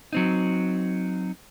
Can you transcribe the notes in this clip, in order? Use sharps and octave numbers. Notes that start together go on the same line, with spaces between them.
F#3 C4 D#4